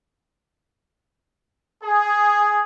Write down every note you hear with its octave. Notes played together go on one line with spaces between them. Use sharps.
G#4